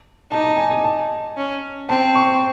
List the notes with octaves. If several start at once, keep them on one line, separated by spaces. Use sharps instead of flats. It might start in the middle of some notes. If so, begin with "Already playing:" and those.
D#4 A5
A5
G#5
G#5
A5
C#4
C4 A5
C#6